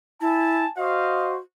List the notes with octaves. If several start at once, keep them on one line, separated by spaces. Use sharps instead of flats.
E4 G#5 A5
F#4 C5 D#5 F5